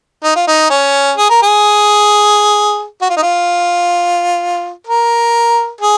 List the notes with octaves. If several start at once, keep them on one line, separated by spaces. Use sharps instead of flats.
D#4
F4
D#4
C#4
G#4
A#4
G#4
F#4
F4
D#4
F4
A#4
G#4